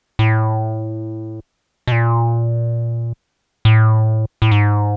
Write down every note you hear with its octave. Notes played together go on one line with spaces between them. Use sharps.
A2
B2
A#2
A2
A2
G#2